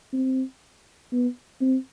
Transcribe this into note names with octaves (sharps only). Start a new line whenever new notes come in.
C4
B3
C4